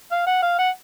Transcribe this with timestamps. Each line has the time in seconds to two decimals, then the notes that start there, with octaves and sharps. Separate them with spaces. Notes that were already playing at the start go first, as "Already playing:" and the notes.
0.12 F5
0.27 F#5
0.43 F5
0.59 F#5